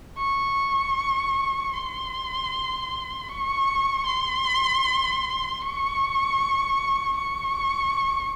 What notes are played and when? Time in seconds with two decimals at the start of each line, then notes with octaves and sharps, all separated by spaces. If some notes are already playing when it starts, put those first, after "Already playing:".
0.17 C#6
1.73 C6
3.29 C#6
4.06 C6
5.61 C#6
7.16 C#6